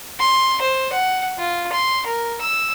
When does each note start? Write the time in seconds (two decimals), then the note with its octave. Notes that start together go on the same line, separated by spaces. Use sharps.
0.19 C6
0.61 C5
0.92 F#5
1.37 F4
1.72 C6
2.06 A#4
2.41 E6